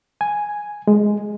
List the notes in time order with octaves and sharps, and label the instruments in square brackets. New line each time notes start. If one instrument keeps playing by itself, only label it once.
[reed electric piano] G#5
G#3